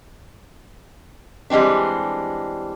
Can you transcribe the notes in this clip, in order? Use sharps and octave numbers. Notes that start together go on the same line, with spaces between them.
E3 G3 G#3 C4 D4